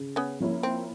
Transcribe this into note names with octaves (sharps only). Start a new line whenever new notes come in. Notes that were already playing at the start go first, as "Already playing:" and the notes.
Already playing: C#3
B3 C#4
F3 A#3 C#4 E4
C4